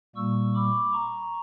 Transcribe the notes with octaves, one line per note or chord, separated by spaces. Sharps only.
A#2 G3 A#3 C#6 E6
B5 D6
A#5 C#6